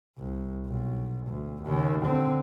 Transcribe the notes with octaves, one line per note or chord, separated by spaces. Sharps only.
C2
B1
D2
D#2 C#3
D3 C4